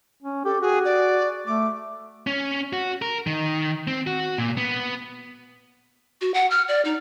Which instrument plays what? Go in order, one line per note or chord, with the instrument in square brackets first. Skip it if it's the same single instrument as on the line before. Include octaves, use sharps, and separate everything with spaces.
[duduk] C#4
[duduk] G4 [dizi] A4
[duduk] F#4 [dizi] G#4
[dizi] D5
[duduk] A3 [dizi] D6
[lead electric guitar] C#4
F#4
A#4
D#3
C4
F#4
A#2
B3
[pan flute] F#4
F#5
F6
D5
D#4